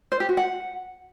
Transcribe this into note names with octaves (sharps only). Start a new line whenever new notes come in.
C5
G4
F#4
F#5